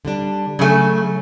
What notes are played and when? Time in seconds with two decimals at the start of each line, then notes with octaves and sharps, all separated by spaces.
0.05 D3 G3 D4
0.59 C#3 F#3 A3 G#5